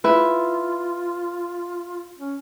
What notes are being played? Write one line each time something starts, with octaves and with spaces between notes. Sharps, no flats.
E4 F4 B4
C#4